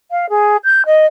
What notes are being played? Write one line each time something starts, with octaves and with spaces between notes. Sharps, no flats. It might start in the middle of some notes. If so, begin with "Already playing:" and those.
F5
G#4
G6
D#5